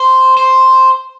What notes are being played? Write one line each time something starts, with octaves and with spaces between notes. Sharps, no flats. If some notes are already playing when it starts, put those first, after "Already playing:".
Already playing: C5
C5